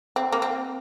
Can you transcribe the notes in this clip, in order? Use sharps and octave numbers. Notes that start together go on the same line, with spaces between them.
C4
A#3
C4